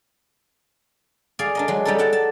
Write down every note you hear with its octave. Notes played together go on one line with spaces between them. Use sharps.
G#4 D5 F5
D4 A#4 D#5
F#3 G#3
G3 D#4 A4
G4 F#5 A5
A5